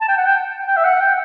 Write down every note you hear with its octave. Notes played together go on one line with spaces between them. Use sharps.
A5
G5
F#5
G5
G5
E5
F#5
G5